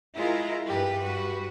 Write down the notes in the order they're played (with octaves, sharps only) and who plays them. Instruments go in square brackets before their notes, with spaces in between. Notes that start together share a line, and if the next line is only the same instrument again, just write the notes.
[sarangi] G#3 [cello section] E4 F4 A#4
[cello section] G2 G3 B4 [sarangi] G4
[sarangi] F#4